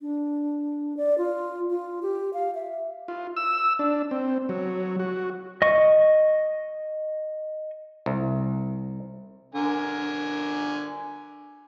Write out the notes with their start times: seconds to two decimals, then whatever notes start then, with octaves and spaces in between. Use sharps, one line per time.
0.02 D4
0.97 D5
1.18 F4
1.70 F4
2.02 G4
2.34 F5
2.55 E5
3.08 F4
3.36 E6
3.79 D4
4.11 C4
4.49 F#3
4.99 F#4
5.62 D#5 C#6
8.06 C2
9.55 D3 A#4 G#5